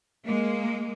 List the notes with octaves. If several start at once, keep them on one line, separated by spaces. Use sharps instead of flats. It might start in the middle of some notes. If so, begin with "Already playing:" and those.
G#3 A#3